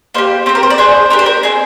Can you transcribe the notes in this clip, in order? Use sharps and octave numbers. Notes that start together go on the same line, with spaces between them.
A#3 D#4 G4 C5
C4 G4 C5
A#4
C5
D5
D4 G#4 C5
D4 G4 A#4
C5
A#4
C4 D#4 G#4